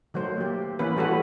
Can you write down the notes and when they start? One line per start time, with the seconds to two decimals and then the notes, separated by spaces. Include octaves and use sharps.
0.14 D#3 F#3 A3 C5
0.37 A#3 G4
0.79 E3 A#3 C#4 B4
0.97 G3 A3 F#4 A4 B4